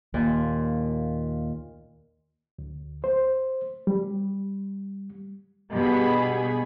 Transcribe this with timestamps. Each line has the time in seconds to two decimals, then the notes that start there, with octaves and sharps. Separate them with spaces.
0.14 D#2 A#2
2.59 D2
3.04 C5
3.87 G3
5.71 G2 B2 G4 G#4 B5